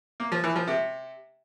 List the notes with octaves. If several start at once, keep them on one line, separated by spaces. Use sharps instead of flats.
A#3
F3
E3
F3
C3